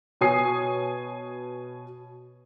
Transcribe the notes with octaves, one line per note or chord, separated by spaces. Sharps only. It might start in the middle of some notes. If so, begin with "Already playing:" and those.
B2 C#5 G#5 D#6 C7